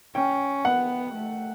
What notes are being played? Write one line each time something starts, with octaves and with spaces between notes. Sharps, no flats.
C#4 G5
B3 F#5
A3